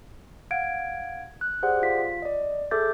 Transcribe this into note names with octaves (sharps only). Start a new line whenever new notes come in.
F5 F#5 G#6 D7
F#6
G4 G#4 C5 D5 F#5
F4 F5 B6
D5 D#5
G#4 A4 E5 D6 G6 A6